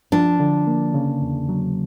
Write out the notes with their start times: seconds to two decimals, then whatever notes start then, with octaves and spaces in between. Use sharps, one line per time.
0.12 F3 D4
0.40 D3
0.67 A#3
0.94 C#3
1.22 E2
1.49 F#3